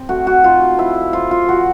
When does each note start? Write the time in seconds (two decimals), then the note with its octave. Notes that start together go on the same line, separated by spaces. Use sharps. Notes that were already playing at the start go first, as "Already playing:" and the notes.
Already playing: C4
0.09 A3 F#4
0.27 F#4
0.44 D#4 F4
0.78 F3 E4
1.13 F3 F4
1.31 F4
1.48 F3 F#4